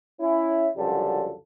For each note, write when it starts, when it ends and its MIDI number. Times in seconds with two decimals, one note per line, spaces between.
0.20 0.67 61
0.20 0.67 64
0.77 1.32 37
0.77 1.32 42
0.77 1.32 50
0.77 1.32 53
0.77 1.32 55
0.77 1.32 69